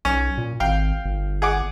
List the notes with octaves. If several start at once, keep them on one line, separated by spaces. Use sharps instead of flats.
B1 C#4
A#2
G#1 F5 G5
G1
G#4 F#5 D6